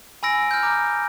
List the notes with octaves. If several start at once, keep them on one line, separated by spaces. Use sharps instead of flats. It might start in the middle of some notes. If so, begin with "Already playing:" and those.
G#5 B5 E6 A#6 D7
F6 G6
A#5 D6